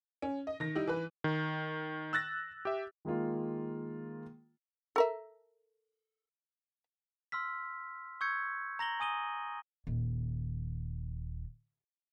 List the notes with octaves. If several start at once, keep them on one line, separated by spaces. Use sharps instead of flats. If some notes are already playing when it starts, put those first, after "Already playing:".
C#4
D#5
D#3 A#6
G3 D#4 E4 G4
E3 B4
D#3
E6 F#6 A6 A#6
G4 E5
D#3 G#3 A#3 F4
A4 A#4 E5
C6 E6 F6 B6
C#6 E6 G6 G#6 C#7
A#5 A#6 F#7 G7
G#5 D#6 D#7 G7
D#1 D#3